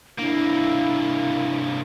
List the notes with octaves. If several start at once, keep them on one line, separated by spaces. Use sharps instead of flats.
C2 A#3 D4 E4